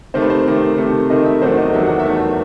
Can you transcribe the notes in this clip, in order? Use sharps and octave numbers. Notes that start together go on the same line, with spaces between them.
C3 D#3 A3 C5
B4
C5
C3 D#3 A3
C3 D#3 A3
C3 D#3 A3 D#5
E5
E2 D#3 F#3 A3 C5
D#5
E2 D#3 F#3 A3 E5
F#5
E5
E2 D#3 F#3 A3